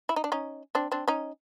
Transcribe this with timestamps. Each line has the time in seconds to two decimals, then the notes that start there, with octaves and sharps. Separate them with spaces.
0.09 E4
0.16 D#4
0.24 D4
0.32 C#4 D#4
0.75 C4 D4
0.92 C4 D4
1.08 C#4 D#4